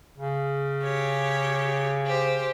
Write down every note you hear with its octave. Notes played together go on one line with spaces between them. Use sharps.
C#3
G4 C#5
G4 C5